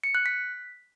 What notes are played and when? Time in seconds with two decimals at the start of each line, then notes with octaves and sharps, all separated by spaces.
0.04 C#7
0.15 F#6
0.26 B6